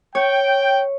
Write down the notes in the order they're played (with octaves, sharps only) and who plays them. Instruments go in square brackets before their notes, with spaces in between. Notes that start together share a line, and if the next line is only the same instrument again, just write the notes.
[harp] C#5 [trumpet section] G5